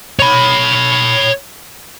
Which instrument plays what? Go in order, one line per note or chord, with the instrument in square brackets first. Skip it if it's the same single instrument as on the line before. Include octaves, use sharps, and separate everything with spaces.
[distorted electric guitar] C#5 B5